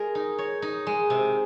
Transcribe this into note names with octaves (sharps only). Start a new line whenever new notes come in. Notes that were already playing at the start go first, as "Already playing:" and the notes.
Already playing: G#3 A#4
D#4
C#5
D#4
G#3
C3